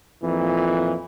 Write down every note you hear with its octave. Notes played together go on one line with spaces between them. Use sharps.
F2 A#2 E3